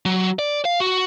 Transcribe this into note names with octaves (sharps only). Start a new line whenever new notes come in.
F#3
D5
F5
F#4